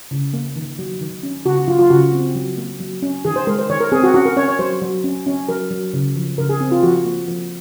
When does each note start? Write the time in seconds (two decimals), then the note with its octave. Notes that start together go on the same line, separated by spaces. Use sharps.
0.11 C#3
0.33 A#3
0.56 D#3
0.79 F#3
1.01 D#3
1.23 C#4
1.45 C#3 F#4
1.56 F#4
1.68 F#3 F4
1.79 F4
1.90 C#3 F#4
2.13 C4
2.35 F#3
2.58 A#3
2.80 F#3
3.02 C#4
3.25 D#3 G#4
3.36 C5
3.47 G#3 A#4
3.59 C5
3.70 D#3 C#5
3.80 A#4
3.92 C4 G#4
4.03 F#4
4.14 C#4 F#4
4.26 A#4
4.37 C#4 C#5
4.48 C#5
4.59 F#3 C5
4.82 F#3
5.04 C#4
5.26 C#4
5.49 F#3 A#4
5.71 F#3
5.94 C#3
6.16 F3
6.38 C#3 A#4
6.49 G#4
6.61 C4
6.72 F4
6.83 F3 F#4
7.05 A#3
7.28 F3